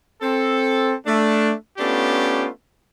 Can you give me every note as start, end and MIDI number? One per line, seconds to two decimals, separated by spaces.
0.22 0.94 60
0.22 0.94 69
1.06 1.53 57
1.06 1.53 62
1.78 2.47 57
1.78 2.47 59
1.78 2.47 61
1.78 2.47 62
1.78 2.47 65
1.78 2.47 67